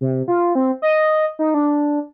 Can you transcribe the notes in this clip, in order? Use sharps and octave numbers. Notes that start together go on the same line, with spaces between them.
C3
F4
C4
D#5
D#4
D4